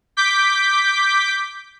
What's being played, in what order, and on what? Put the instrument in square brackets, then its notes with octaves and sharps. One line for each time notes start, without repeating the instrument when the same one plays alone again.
[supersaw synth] D6 G6 B6